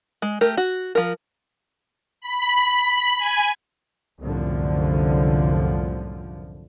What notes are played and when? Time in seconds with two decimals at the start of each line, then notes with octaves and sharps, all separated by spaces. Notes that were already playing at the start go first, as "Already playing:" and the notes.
0.22 G#3
0.41 A3 G4 A#4
0.57 F#4
0.95 F3 A#4
2.21 B5
3.18 G#5
4.21 C2 F#2 A2 D3 F3